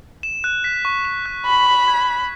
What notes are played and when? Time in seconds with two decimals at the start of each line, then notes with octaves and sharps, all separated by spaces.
0.23 E7
0.44 F#6
0.64 B6
0.85 C#6
1.05 E7
1.26 F#6
1.46 B5 B6
1.67 C#6
1.88 G#6
2.08 B6